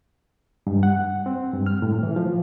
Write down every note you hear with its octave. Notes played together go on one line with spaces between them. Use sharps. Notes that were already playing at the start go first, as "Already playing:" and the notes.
G2
F#5
C4
G2
F6
A2
E3
F3